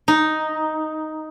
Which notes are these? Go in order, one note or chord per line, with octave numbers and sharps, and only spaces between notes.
D#4